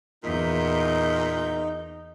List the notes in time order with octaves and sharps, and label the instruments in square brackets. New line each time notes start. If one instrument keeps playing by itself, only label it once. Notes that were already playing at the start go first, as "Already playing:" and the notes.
[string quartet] E2 G6 [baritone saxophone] A#2 [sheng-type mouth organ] D#4